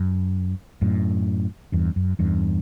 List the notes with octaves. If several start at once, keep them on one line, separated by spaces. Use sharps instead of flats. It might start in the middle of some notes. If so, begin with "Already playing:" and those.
Already playing: F#2
F#2 A2
E2 G2
F#2
E2 G2